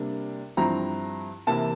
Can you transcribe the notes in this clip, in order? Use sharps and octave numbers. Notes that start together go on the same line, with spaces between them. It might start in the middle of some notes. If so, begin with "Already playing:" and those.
Already playing: C3 G3 A#3 D4
G2 F3 C4 E4 A#5
C3 E3 A#3 E4 A5